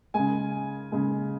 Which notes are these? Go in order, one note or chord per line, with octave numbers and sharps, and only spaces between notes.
C#3 G#3 G#5
C#3 G#3